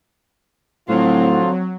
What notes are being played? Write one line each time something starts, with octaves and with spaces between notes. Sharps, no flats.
A2 D3 F3 F#3 C4 F4